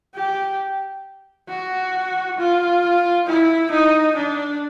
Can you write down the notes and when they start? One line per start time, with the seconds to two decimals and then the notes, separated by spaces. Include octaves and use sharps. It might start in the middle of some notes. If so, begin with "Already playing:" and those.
0.15 G4
1.49 F#4
2.38 F4
3.27 E4
3.71 D#4
4.16 D4